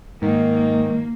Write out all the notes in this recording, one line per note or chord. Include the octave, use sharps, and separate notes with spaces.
G#2 D#3 A#3